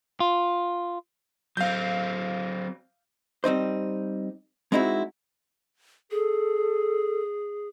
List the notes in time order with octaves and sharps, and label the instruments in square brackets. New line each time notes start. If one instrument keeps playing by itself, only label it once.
[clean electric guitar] F4
[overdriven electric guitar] F#3 C4 [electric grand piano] F5 G6
[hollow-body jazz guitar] G3 C4 D#4 C5
G#3 C4 D#4 E4 F#4
[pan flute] G#4 [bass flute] A4